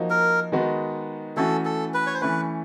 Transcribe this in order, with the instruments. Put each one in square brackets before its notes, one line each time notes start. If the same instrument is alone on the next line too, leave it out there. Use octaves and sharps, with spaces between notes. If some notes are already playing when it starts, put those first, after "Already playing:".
Already playing: [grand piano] F3 A#3 D#4 F#4
[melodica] A#4
[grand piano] D#3 G#3 B3 D#4 F#4
[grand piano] E3 A3 C#4 F#4 [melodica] A4
[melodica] A4
B4
C#5
C5
[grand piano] E3 A3 C#4 [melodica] B4